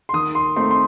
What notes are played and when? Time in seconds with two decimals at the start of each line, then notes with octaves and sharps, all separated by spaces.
0.09 C6
0.13 D#3 D#6
0.35 C6
0.56 A3 C4 D#4 C6
0.71 C6